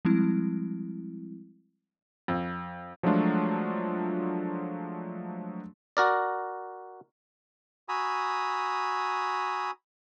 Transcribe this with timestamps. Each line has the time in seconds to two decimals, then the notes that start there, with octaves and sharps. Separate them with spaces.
0.05 F3 G3 G#3 C4 E4
2.28 F2
3.03 F3 F#3 G#3 A3 D4 F4
5.97 F#4 A#4 D5
7.89 F#4 G#5 A#5 B5 D#6 E6